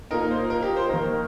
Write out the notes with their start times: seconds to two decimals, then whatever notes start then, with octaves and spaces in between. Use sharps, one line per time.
0.11 A#2 A#3 D#4 A#4
0.31 C5
0.50 A#4
0.62 G4
0.77 C5
0.89 D#3 A#3 D#4 A#4